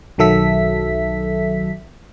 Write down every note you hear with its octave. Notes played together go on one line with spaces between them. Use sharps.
B1 D#3 F#3 A4 E5 B6